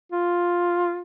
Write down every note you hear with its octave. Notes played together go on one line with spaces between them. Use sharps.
F4